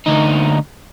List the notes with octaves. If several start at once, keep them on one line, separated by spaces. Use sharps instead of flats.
D2 D#4